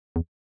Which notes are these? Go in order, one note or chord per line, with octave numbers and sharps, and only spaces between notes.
E2